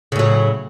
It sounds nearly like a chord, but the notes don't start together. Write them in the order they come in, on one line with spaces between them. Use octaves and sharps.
C#3 A2 F#3